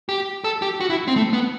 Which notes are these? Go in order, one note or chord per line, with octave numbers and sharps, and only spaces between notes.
G4
A4
G4
F#4
E4
C4
A3
B3